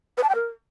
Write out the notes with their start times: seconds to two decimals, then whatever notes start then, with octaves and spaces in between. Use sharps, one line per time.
0.17 B4
0.23 A5
0.29 G5
0.35 A#4